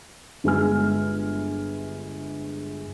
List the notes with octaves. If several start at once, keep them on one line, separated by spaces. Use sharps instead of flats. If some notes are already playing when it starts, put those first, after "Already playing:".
G1 G#3 G#5 F6